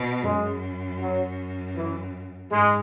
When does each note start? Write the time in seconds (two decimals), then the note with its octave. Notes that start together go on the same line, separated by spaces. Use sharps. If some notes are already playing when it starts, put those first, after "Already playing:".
Already playing: B2
0.23 F#2 G#3
0.99 F#3
1.75 E3
2.50 G#2 G#3